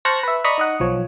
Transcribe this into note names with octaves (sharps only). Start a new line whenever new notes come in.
C5 A5 C#6 F6 F#6 A#6
B4 E5
D5 D#5 A#5 B5 C#6 D#6
D#4 D#5 F#5
B1 F3 C#5